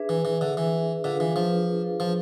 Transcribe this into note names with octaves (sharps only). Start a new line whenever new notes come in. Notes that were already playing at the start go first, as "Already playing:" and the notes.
Already playing: D4 G#4 B4 E5
E3
E3
D3
E3
D3 D4 F4 G#4 B4 F5
E3
F3
F3